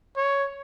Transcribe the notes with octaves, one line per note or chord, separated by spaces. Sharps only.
C#5